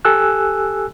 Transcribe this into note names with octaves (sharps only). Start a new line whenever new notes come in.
G4 A4 G#5 E6 F#6